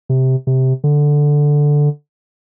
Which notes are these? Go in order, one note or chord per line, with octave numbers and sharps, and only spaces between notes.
C3
C3
D3